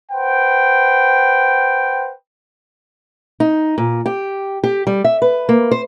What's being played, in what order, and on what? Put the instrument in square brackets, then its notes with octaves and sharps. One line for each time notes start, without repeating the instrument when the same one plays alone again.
[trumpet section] B4 C5 F#5 G5
[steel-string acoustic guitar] D#4
A#2
G4
G4
G3
E5
B4
A#3
C5